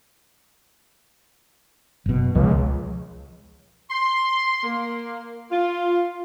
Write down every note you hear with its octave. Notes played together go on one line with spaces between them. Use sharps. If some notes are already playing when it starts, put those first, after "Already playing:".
F#1 B2
C#2 F3
C6
A#3
F4